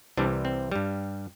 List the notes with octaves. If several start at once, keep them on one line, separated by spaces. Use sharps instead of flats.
C2 C3 E3 G3 D4
C4
G2 G3